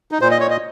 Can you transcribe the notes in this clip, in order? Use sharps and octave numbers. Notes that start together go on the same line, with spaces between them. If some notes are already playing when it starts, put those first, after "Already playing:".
D#4
A#2 C5
D#5
C#5
D#5